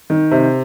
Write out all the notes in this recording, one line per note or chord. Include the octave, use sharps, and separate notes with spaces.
D#3
C3